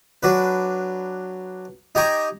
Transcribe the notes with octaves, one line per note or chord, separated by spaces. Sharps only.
F#3 D4 B4
D#4 G4 G#5 A#5 C#6